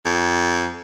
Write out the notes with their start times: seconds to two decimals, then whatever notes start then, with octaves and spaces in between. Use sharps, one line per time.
0.05 F2